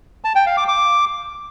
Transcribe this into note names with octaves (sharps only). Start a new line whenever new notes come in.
A5
G5
F5
D6
D6